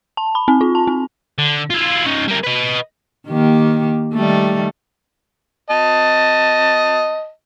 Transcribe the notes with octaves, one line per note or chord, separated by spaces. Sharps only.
A5
B5
C4
F4
A5
C4
D3
E4 F4
C#4 D#4
G3 A#4
B4 D#5
D#3 A#3 G4
D#3 G3 A3
D#5 A5